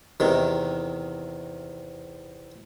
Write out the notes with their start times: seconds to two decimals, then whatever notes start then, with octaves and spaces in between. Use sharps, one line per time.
0.20 E2 C3 D#3